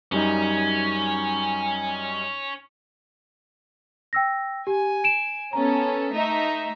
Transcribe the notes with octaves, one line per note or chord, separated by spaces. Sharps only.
F#2 G3 C#4 D#4
G5 E6 A#6
G4 G#5
D7 E7
B3 C#4 A4 A#5
A3 D#4 E5